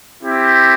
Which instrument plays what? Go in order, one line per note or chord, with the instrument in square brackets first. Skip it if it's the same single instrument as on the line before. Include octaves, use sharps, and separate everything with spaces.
[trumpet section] C4 E4 G4